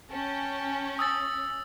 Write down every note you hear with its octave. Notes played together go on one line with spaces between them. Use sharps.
C#4 G5 A5
D#6 E6 A6